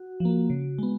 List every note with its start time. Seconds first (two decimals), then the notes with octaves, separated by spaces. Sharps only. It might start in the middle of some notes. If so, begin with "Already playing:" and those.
Already playing: F#4
0.20 F3 A#3
0.50 C#3
0.79 G#3 B3